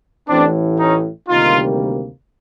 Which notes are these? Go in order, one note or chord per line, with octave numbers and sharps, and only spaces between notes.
A1 A2 E3 C4 D4
C#4 D#4
D2 C3 D#3 G3 A#3 D#4 F4